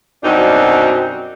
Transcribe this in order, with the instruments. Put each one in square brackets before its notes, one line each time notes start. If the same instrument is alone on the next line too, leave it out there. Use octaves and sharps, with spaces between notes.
[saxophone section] F#2 B2 G3 C4 D4 D#4